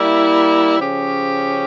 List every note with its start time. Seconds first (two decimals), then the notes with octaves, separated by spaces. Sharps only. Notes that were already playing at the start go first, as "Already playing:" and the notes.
Already playing: G3 A#3 E4
0.79 C#3 F3 C#4 G4